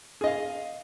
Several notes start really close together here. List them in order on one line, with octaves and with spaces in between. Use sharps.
G#4 D#5 F5